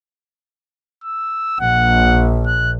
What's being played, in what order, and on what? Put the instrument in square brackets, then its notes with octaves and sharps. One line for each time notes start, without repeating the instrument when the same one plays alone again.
[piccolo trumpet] E6
[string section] A#1 [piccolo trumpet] F#5
[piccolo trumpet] F#6